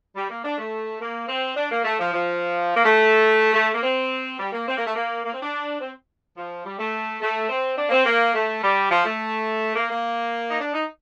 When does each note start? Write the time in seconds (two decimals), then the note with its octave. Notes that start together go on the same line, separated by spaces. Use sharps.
0.16 G3
0.29 A#3
0.44 D4
0.58 A3
1.00 A#3
1.28 C4
1.56 D4
1.71 A#3
1.84 A3
1.99 F3
2.14 F3
2.75 A#3
2.84 A3
3.54 A3
3.74 A#3
3.83 C4
4.39 G3
4.53 A#3
4.67 C4
4.77 A#3
4.86 A3
4.95 A#3
5.24 A#3
5.33 C4
5.42 D4
5.80 C4
6.37 F3
6.65 G3
6.79 A3
7.21 A3
7.49 C4
7.78 D4
7.87 A#3
7.92 C4
8.06 A#3
8.34 A3
8.63 G3
8.90 F3
9.05 A3
9.75 A#3
9.89 A#3
10.50 D#4
10.60 D4
10.74 D#4